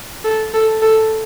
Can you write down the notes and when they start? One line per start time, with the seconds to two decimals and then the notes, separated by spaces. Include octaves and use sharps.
0.24 A4
0.54 A4
0.82 A4